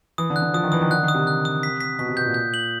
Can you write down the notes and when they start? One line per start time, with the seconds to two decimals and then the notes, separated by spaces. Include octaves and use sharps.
0.18 E3 D#6
0.30 D3
0.36 F#6
0.42 D3
0.54 F3 D#6
0.63 D#3
0.72 E3 D#6
0.81 D#3
0.90 D3 F#6
1.03 D#3
1.08 D#6
1.14 C3
1.27 F#6
1.45 D#6
1.63 B6
1.81 B6
1.99 B2 B6
2.08 C3
2.17 B2 G6
2.26 A#2
2.34 G6
2.54 F#7